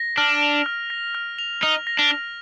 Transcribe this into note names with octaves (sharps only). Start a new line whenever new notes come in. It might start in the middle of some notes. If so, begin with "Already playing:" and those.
Already playing: A#6
D4 F6
F7
F6
A#6
F6
F7
D#4 F6
A#6
D4
F6